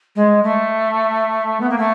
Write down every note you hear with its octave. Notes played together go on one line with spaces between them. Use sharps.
G#3
A3
B3
A#3
A3